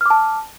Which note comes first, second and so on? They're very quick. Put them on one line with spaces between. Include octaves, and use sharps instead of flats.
F6 D6 A5